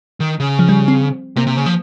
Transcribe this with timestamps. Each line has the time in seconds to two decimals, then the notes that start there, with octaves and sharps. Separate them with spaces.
0.20 D#3
0.40 C#3
0.59 F3
0.69 G3
0.88 C4
1.36 C3 A#3
1.47 C3
1.56 C#3
1.66 F3